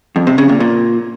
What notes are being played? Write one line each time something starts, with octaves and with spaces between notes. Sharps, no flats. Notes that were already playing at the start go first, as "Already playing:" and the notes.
F2
C3
C#3
A#2
A#2